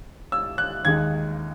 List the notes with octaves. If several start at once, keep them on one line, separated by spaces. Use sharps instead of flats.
E6
F#6
D#2 D#3 G#3 D#4 G#6